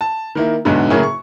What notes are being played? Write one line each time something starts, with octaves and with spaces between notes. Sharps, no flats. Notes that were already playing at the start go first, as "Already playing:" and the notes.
A5
D#3 A#3 E4
B1 E2 G#2 D3
A2 C#3 F#3 A#3 E4 G#4
C#6